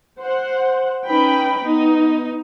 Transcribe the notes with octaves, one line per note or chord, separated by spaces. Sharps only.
C5 F#5
C#4 D#4 B4 G5 B5
B3 D#4